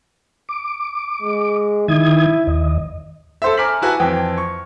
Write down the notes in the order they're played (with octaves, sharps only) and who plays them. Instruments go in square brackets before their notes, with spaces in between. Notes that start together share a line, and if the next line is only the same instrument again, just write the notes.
[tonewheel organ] D6
[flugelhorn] G#3
[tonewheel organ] D#3 D#6 G#6 [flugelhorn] E4
[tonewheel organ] D#2 D#5
[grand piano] A4 C5 E5
G#5 A#5 D6 F6 B6 F#7
E4 F#4 B4 G#5 A5
F2 E3 G5
C#6